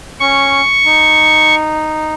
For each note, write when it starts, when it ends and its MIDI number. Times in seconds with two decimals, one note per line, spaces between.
0.20 0.61 61
0.20 1.55 85
0.85 2.14 63